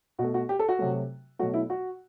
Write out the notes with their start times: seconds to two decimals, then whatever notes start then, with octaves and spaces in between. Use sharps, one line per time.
0.19 B2 F#4
0.24 A3
0.34 F#4
0.49 G4
0.59 A4
0.69 F#4
0.79 C3 F#3 A3
1.39 B2 F#3 A3 F#4
1.54 E4
1.70 F#4